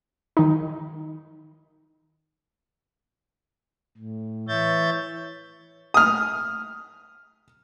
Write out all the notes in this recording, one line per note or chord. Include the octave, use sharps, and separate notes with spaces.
D#3 D#4
A2
E3 C#5 E5 G6 A6
D#6 F6